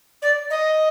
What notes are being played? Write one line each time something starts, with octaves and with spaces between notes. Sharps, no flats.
D5
D#5